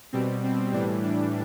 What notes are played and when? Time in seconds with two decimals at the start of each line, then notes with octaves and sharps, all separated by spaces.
0.13 B2 G3 C4
0.44 C4
0.73 A2 E3 G3 D4
1.03 D4